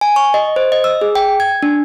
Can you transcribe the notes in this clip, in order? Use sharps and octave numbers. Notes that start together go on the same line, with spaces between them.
G#5
C#6
D#5
C5
D#5
E6
G#4
G5
G#6
D4